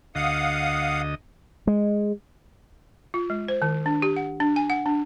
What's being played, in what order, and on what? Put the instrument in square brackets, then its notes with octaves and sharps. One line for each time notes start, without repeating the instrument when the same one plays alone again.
[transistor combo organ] D2 D#5 [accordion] F5 F#5 D#6
[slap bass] G#3
[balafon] F4
G#3
C5
D#3
D4
G4
F#5
D4
G#5
F#5
D4